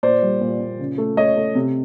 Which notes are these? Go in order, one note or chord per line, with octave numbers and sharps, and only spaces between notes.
A#2 C5 D5
G3
A#2
A#2
C#3
A3
A3 C#5 D#5
A3
C3